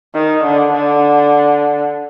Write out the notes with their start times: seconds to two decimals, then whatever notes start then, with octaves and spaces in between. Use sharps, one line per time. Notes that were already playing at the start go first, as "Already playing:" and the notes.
0.14 D#3
0.44 D3
0.73 D3